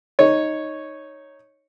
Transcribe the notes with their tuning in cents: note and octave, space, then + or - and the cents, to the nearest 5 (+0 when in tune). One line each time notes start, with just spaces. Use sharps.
D#4 +0 C#5 -5